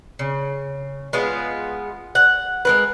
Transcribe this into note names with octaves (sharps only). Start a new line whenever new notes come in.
C#3
G#3 B3 F4
F#5
G#3 A#4 B4